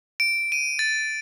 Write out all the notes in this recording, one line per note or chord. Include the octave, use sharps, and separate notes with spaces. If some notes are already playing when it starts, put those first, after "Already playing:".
D7
D#7
A6